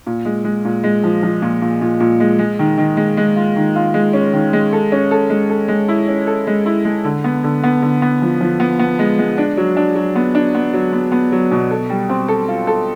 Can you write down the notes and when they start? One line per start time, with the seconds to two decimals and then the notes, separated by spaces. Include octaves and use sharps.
0.07 A#2
0.25 G#3
0.45 G#3
0.65 A#2
0.84 G#3
1.04 F3
1.23 F3
1.42 A#2
1.62 A#2
1.81 A#2
2.00 A#2
2.20 G#3
2.39 G#3
2.59 D#3
2.78 D#3
2.97 G#3
3.17 G#3
3.36 F4
3.56 D#3
3.76 F4
3.94 G#3
4.13 C#4
4.33 D#3
4.53 G#3
4.73 A4
4.92 C#4
5.11 A4
5.30 G#3
5.50 A4
5.68 G#3
5.88 E4
6.08 C#4
6.27 A4
6.47 G#3
6.66 E4
6.85 G#3
7.04 D3
7.24 B3
7.44 D3
7.64 B3
7.82 D3
8.02 B3
8.22 F3
8.41 F3
8.60 B3
8.79 B3
8.99 G#3
9.19 G#3
9.38 D4
9.57 F#3
9.77 D4
9.95 F#3
10.15 B3
10.35 D4
10.55 B3
10.74 F#3
10.93 B3
11.12 B3
11.32 F#3
11.51 B2
11.71 A4
11.90 G3
12.09 C4
12.28 A4
12.48 F4
12.67 A4